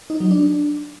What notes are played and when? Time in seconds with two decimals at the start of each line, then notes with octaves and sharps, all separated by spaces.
0.10 D#4
0.20 F#3
0.31 D4